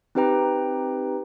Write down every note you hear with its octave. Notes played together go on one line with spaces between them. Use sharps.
C4 D#4 G4 B4 G5 A#5